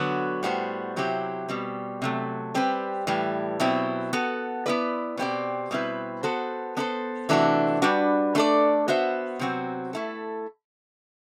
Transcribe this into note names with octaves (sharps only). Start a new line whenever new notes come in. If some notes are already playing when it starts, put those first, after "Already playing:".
Already playing: D3 F#3 B3 F#4
A2 G3 B3 F#4 C5
C3 F#3 C4 E4 G4
B2 G3 C4
C3 F#3 A3
G3 C4 G4 B4
A2 E3 G3
B2 F#3 C4 E4
B3 F#4 A4
B3 E4 B4 D5
B2 A3 C4 G4 D5
B2 G3 C4 E4 B4
B3 F#4 A4 C5
B3 D4 A4 C5
C3 E3 A3 D4 F#4
G3 D4 F#4 B4
A3 D4 A4 D5
B3 F#4 C5 E5
C3 F#3 C4 F#4
A3 E4 A4